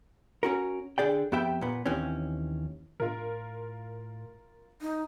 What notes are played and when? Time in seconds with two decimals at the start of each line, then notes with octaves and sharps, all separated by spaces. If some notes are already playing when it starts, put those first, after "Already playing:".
0.43 C#4 F#4 A#4
0.98 D3 G#4 D5 G5
1.32 F2 B3 G4 E5 G5
1.61 A#2 B3
1.86 D#2 E3 C4 C#4
3.00 A2 F4 A#4
4.82 D#4